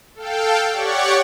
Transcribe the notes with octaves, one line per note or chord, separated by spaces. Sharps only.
A4 F5 G5
G4 C#5 D5 F#5 C#6